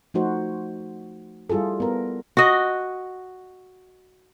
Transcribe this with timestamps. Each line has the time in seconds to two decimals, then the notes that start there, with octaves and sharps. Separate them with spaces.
0.14 F3 A3 D#4 F#4 C5
1.50 G3 E4 F4 G#4 A4
1.80 B3 A#4
2.37 F#4 D#5